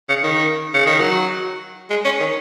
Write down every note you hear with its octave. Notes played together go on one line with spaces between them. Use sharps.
C#3
D#3
C#3
D#3
F#3
G#3
C#4
D#3